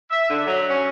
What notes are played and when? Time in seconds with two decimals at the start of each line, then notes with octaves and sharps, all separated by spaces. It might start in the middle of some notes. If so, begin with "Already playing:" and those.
0.10 E5
0.29 D3
0.46 F#3
0.69 C#4